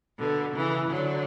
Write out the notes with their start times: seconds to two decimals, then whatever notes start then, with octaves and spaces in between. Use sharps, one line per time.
0.19 B2 D3
0.54 C#3 E3
0.89 D3 F#3